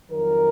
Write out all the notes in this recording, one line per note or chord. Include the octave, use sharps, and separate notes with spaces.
F2 D#3 F#3 A#4